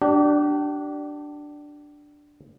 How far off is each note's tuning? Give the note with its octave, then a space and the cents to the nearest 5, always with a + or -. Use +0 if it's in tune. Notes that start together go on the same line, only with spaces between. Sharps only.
D4 +0 G4 -35